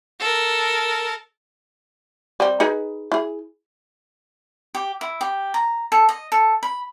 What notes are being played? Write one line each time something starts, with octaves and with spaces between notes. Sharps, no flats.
A4 A#4
G3 C4
D#4 G#4 B4
E4 G#4
G4
E4
G4
A#5
A4
D#5
A4
B5